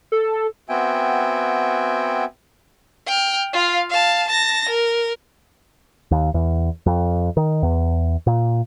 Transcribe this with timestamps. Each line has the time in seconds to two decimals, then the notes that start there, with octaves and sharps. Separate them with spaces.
0.12 A4
0.69 B3 C4 F#4 E5 G5 G#5
3.07 G5 F6
3.53 F4 F5
3.90 F5 A5
4.28 A5 A#6
4.69 A#4
6.11 D#2
6.34 E2
6.86 F2
7.37 D#3
7.63 E2
8.27 A#2